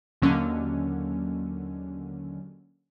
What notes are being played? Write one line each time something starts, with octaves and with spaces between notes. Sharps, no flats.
D#2 D3 F#3 A#3 C#4